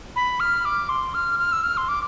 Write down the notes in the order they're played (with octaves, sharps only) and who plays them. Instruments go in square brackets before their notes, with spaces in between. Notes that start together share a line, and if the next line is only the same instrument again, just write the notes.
[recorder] B5
F6
D6
C6
F6
F6
E6
F6
C6
D6